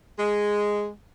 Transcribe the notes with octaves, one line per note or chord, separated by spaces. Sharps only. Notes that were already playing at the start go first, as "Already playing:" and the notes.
G#3